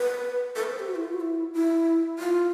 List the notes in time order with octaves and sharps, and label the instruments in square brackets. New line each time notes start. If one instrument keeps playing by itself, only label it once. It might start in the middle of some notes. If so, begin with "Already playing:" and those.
Already playing: [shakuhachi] B4
A4
B4
C5
G4
F#4
E4
F4
F#4
E4
E4
F4